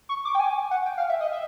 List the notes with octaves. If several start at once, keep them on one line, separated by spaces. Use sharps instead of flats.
C#6
D6
G5
G#5
F#5
G5
F5
E5
D#5
E5